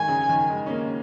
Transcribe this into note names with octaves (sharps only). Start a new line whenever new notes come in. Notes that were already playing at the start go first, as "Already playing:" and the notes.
Already playing: D#3 G#3 G#5
C#3
D#3
G#3
C#4
A#3